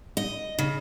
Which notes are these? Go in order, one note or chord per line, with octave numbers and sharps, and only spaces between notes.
D#5
C#3